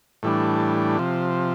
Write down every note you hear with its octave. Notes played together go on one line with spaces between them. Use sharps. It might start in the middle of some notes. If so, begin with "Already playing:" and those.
A2 E3 G3 D4
C3 F3